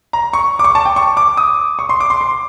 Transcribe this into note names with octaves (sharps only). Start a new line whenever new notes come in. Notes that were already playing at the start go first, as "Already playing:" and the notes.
A#5
C#6
D6
C#6
A5
G5
C#6
D6
D#6
C#6
C6
D6
C6
C6